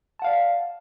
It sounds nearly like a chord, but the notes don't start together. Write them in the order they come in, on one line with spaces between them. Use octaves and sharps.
A5 F#5 F5 D5